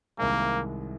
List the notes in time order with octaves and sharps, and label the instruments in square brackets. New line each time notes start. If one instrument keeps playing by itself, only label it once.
[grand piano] C2 C3 D#3 G#3 [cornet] A#3